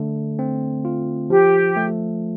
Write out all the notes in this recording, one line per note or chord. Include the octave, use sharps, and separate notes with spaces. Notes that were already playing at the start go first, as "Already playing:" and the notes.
Already playing: D3 A3
C4
F4
F3 G4
A3